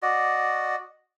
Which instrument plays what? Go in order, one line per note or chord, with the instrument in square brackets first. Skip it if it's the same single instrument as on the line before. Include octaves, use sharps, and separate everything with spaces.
[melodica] F#4 D5 D#5